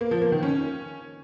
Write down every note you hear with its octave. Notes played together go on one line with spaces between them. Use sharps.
A#3
F3
A#3
D#3
C#4